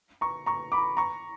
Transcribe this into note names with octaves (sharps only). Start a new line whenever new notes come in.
A#5 C#6
A#5 C#6
B5 D6
A#5 C#6